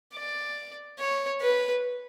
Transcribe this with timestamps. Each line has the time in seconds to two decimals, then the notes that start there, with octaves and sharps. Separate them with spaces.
0.14 D5
0.99 C#5
1.41 B4